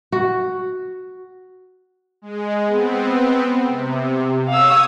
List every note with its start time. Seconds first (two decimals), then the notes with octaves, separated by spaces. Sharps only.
0.12 F#4
2.22 G#3
2.67 B3 C4
3.67 C3
4.48 C#5 F5 D#6 E6 G#6